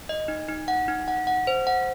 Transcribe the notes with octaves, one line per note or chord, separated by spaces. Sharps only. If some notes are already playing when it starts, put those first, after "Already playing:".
D#5
D#4
D#4
F#5
D#4
F#5
F#5
C5
F#5